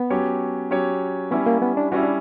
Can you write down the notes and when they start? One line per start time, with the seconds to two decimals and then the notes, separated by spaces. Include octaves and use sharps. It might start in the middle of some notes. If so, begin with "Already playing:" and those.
Already playing: B3
0.10 F#3 C#4 G4 C#5
0.71 F#3 C#4 G4 C#5
1.31 G3 B3 C#4 E4
1.46 A#3
1.62 B3
1.77 D4
1.92 G3 C#4 E4 F#4
2.03 D4